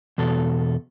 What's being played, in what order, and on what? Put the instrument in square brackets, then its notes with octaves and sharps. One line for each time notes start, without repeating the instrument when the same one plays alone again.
[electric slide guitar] E2 B2 A4